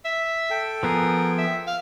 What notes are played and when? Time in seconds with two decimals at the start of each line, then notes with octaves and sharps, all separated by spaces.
0.05 E5
0.50 A4 G5
0.83 F3 B3 G#4 A#4
1.38 E5
1.67 F5